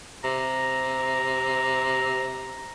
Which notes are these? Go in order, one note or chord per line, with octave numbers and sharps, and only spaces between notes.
C3 A#5